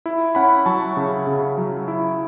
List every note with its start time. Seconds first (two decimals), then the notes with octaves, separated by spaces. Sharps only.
0.06 E4
0.35 C#4 F#5 B5
0.66 F#3 A5 C#6
0.97 C#3
1.27 C#3
1.58 F#3
1.88 E4